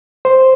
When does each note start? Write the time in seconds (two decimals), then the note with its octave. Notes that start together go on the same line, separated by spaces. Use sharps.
0.25 C5